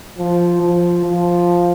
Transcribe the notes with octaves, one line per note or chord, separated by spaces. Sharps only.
F3
F3
F3